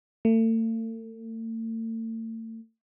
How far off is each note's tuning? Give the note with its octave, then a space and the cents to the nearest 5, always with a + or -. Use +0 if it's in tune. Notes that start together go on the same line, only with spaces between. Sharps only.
A3 +40